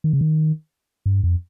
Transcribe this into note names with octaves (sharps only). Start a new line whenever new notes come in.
D#3
C#3
D#3
G2
F2